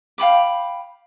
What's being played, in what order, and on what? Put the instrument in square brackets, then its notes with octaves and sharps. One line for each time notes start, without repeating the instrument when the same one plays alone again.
[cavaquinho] F5 G5 B5 D6